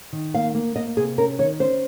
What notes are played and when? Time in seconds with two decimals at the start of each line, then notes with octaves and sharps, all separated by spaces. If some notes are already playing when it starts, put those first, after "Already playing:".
0.13 D#3
0.34 A#3 F5
0.55 A#3
0.76 A#3 D#5
0.97 C3 G#4
1.18 C#4 A#4
1.39 D#3 C#5
1.60 C#4 C5